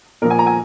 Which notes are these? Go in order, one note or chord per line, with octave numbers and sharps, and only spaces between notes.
A#2 F3 A#4
G#5
A#5
G#5